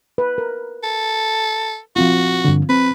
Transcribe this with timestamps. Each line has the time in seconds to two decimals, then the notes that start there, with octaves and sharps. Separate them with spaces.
0.18 B4
0.38 A#4
0.83 A4
1.96 F3 C4 F4 F#4
2.45 G2 D3
2.69 C4 B4